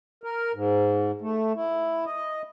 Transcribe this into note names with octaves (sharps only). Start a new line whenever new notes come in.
A#4
G#2
A3
E4
D#5